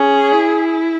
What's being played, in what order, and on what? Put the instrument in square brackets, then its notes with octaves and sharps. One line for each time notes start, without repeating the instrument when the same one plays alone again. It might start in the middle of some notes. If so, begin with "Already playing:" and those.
Already playing: [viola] C#4 [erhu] G#4
[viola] E4